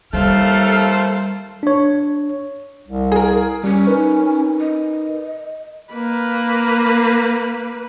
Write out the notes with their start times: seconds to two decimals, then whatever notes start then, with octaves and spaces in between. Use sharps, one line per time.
0.13 D#2 G3 A3 A4 C5 F5
1.63 D4 C#5
2.88 C2
3.12 G#4 A#4
3.64 G3 C#4
3.87 D#4 A#4 B4
4.59 D#5
5.94 A#3 B4